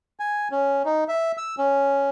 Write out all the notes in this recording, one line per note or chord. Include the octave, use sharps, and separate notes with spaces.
G#5
C#4
D#4
E5
E6
C#4